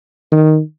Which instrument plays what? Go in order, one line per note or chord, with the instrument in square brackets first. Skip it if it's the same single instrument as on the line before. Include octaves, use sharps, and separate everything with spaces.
[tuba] D#3